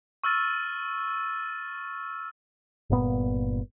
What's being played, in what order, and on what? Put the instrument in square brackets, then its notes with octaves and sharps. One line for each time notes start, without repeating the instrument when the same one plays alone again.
[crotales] C#6 E6 F6 A6 D#7
[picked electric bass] G1 A#2 B3